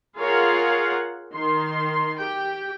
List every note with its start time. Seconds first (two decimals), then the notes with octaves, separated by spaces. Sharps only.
0.19 F4 G#4 A#4 C#5 F5 F#5
1.32 D#3 C6
2.19 G4 G5